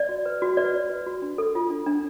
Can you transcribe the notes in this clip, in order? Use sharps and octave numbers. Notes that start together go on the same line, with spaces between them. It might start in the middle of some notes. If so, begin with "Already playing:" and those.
Already playing: D5
F#4
B4
F#4
B4 D5
F#4
B4
F#4
D4
A4
F4
D4
D4